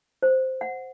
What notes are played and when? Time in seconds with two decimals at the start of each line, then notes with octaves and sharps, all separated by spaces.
0.22 C5
0.61 F#5